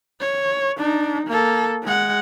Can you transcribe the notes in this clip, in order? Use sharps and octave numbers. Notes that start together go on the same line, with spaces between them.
C#5
D4 D#4
A#3 A4
G#3 F#5